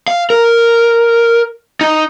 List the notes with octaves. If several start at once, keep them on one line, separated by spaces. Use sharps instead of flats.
F5
A#4
D#4